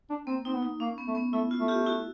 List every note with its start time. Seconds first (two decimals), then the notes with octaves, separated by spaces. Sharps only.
0.10 D4
0.27 A#3 C4
0.45 C4 D#4
0.54 B3
0.63 D#4
0.80 A#3 C#4
0.98 B3
1.07 A3
1.15 B3
1.33 A3 E4
1.51 F4
1.60 A3
1.68 F4 G4
1.86 E4 F#4